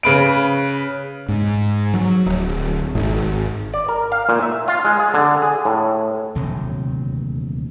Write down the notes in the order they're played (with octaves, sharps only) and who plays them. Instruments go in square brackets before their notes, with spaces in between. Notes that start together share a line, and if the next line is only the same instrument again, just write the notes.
[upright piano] C#3 B4 D7
[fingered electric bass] G#2
F#3
D1
G#1
[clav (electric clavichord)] D5
A#4
F5
A#2
E5
F4
G#3
G#4
D3
G#4
A2
[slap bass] D#1 D2 C3 F#3